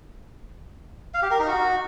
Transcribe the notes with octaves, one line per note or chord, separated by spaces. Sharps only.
F5
G4
A#4
D#4
F#4